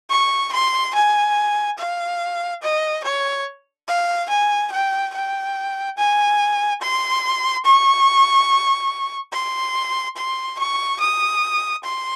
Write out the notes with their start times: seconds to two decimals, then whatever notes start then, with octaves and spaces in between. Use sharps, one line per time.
0.10 C#6
0.52 C6
0.95 G#5
1.78 F5
2.62 D#5
3.04 C#5
3.88 F5
4.29 G#5
4.72 G5
5.14 G5
5.98 G#5
6.82 C6
7.65 C#6
9.33 C6
10.17 C6
10.59 C#6
11.00 D#6
11.84 C6